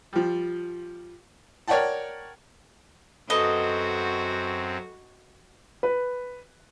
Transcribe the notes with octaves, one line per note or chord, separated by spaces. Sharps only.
F3 G3
A#4 C#5 D5 F#5 G5 A5
F#2 C4 F#4 A4 B4 D#5
B4